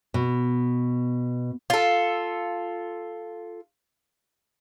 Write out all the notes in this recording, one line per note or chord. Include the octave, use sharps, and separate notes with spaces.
B2
F4 A4